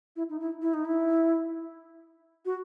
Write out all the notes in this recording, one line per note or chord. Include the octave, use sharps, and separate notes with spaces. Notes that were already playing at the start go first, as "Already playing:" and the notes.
E4
D#4
E4
E4
D#4
E4
F#4